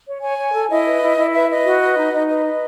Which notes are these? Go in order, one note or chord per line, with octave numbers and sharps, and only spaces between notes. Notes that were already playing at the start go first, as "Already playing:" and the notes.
C#5
C#5 G#5
C#5
A4
E4 D#5
B4
E4
E4
B4 E5
B4 D#5
F#4
B4
D#4
D#4
B4 D#5
B4